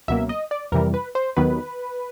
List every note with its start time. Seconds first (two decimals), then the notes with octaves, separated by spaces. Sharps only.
0.08 C#2 B2 F#3 A#3 E5
0.29 D#5
0.51 D5
0.72 F2 C3 E3 G3 A#4
0.94 B4
1.15 C5
1.37 D#2 D#3 F#3 B3 B4